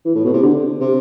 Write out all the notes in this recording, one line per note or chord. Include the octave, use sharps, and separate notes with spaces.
E3
A2
B2
C3
D3
C3